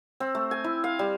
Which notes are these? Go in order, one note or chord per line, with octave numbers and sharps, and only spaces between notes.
C4
A3
G#5
E4
F5
G3